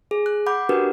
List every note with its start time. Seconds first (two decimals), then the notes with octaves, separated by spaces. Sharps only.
0.11 G#4
0.26 F#6
0.46 F#5 B5 D6 G6
0.69 D4 F#4 G4 A#4 B4